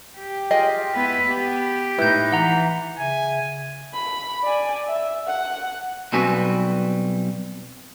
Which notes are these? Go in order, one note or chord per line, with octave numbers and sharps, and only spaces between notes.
G4
F4 G#4 D#5 G5
B3 E4 B4
B3 G4
A2 D#4 E4 B4 G6
E3 F#5 A#5
C#3 E5 G#5
B5
D5 G#5
E5
F#5
B1 G3 C4 F#4 B4 G#5